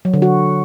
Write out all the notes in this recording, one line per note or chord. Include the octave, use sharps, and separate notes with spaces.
F#3
D3
F#4